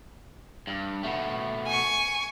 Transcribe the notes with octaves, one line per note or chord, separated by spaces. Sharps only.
G2
B2 A3
G#5 C#6